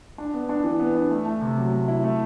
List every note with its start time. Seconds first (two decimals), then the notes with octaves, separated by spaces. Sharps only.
0.18 D4
0.34 B3
0.49 D4
0.64 E3
0.80 B3
0.95 D4
1.11 A3
1.26 A3
1.42 C3
1.57 F#3
1.73 A3
1.88 E4
2.04 A3